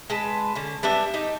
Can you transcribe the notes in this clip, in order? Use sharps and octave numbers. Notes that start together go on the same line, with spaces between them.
G#3 B4 A5
D3 C#4
G3 B3 D4 E5
D#4 G4